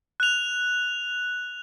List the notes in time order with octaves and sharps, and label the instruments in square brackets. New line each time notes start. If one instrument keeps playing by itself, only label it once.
[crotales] F#6 F7